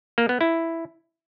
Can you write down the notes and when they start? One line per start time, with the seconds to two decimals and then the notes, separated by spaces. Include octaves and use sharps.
0.18 A#3
0.29 B3
0.41 E4